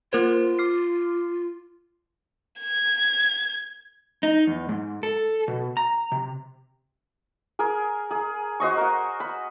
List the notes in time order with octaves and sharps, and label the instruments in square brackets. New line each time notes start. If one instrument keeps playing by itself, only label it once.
[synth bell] A#3 A#4 C5 [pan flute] F4
[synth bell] D6 F6 C7
[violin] G#6
[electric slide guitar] D#4
E2
G#2
A4
B2
A#5
C3
[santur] G#4 A#4
G#4
F#4 C5 D#5 C#6
A#4 F#5
B5